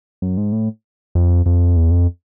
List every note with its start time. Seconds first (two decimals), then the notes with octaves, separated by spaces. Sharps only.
0.22 F#2
0.37 G#2
0.52 A2
1.15 F2
1.46 F2
1.77 E2
1.91 F2